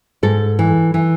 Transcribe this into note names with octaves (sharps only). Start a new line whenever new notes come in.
G#2 A4
E3
E3